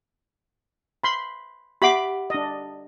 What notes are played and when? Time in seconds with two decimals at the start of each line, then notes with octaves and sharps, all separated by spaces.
1.04 B5 C6
1.82 G4 E5 F#5 B5 D6
2.30 D4 D#5